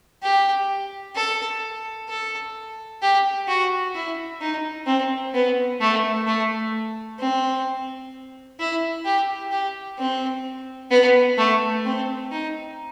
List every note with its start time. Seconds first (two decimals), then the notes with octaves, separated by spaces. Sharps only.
0.22 G4
1.15 A4
2.08 A4
3.02 G4
3.48 F#4
3.95 E4
4.41 D#4
4.87 C4
5.34 B3
5.81 A3
6.27 A3
7.19 C4
8.60 E4
9.05 G4
9.51 G4
9.98 C4
10.91 B3
11.38 A3
11.85 C4
12.31 D#4